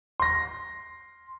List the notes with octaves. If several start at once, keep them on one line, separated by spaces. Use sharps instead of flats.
C6 A#6